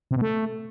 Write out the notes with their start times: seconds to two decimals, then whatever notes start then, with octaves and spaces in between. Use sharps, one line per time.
0.11 C3
0.16 B2
0.21 A3